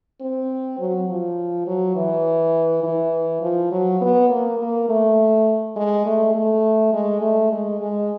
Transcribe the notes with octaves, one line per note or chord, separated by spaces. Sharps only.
C4
F#3
F3
F#3
E3
E3
F3
F#3
B3
A#3
A#3
A3
G#3
A3
A3
G#3
A3
G#3
G#3